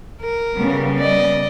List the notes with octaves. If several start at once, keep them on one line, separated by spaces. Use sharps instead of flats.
A#4
C#3 G3 B3
D5 D#5